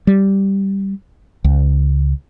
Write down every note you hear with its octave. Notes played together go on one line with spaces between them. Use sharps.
G3
C#2